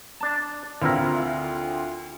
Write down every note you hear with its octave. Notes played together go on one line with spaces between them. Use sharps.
D4 A5
D2 C4 E4 F4 A#4